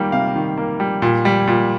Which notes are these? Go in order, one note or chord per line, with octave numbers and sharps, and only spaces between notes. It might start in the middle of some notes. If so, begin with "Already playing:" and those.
Already playing: D#3 G3 A#3
C3 F5
D#3
A#3
G3
A#2
G3
A#2